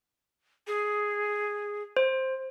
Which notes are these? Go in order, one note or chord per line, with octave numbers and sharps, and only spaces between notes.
G#4
C5